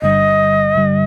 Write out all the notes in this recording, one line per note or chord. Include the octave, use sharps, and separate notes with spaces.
G1 G2 D3 G3 D#5
G1 G2 D3 G3